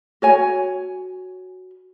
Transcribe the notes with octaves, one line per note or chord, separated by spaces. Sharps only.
F#4 C#5 G#5